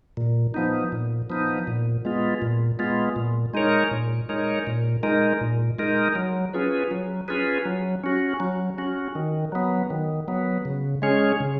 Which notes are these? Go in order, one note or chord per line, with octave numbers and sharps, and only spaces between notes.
A#2
F3 B3 D#4
A#2
F3 B3 D#4
A#2
G#3 B3 F4
A#2
G#3 B3 F4
A#2
G#3 D#4 A#4 C#5
A#2
G#3 D#4 A#4 C#5
A#2
G#3 D#4 A#4
A#2
G#3 D#4 A#4
F#3
C#4 F4 G#4 B4
F#3
C#4 F4 G#4 B4
F#3
C#4 F#4
F#3
C#4 F#4
D#3
F#3 B3
D#3
F#3 B3
C#3
G#3 C#4 G#4 C#5
C#3